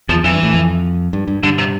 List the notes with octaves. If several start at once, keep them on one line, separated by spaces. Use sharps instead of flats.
E2 F3
F2 E3
G2
A2
F2
G2
G2
G2 D3
C3